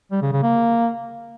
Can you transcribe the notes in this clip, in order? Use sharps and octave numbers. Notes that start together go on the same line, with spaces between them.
G3
C#3
C#3
A#3